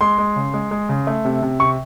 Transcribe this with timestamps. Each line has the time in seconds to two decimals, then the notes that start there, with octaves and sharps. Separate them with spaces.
0.01 G#3 C6
0.18 G#3
0.36 C#3
0.54 G#3
0.71 G#3
0.89 C#3
1.07 A3
1.25 C3
1.42 C3
1.60 C3 C#6